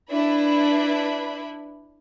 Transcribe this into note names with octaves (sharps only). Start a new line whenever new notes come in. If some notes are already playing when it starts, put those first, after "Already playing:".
D4 E4 B4 B5